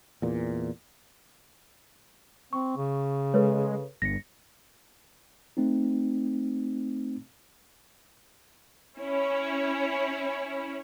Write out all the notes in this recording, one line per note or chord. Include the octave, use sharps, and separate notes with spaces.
E2 A#2
C4 C#6
C#3
G#3 A4 B4 C#5
G1 A#6 C#7
A3 C4 D#4
C#4 E4 C#5